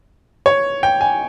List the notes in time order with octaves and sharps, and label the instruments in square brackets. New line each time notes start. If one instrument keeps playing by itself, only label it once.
[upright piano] C#5
G5
G#5